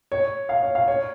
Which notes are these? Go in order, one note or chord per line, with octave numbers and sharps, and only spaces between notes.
C#5
F5
C#5
F5
C#5